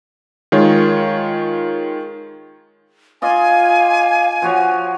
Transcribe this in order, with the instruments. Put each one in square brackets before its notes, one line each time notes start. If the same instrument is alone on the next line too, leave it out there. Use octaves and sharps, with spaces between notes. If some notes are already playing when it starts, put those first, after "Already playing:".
[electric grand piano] D#3 G#3 F4 C#5
[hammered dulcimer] F4 D5 D#5 [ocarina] F5 [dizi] G#5
[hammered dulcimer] F3 F#4 C#5